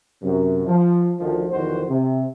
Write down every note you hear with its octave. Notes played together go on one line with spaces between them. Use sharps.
F#2 C3
F3
D2 D#3 F3
B1 E2 D#3 F3 F#4 C5
C3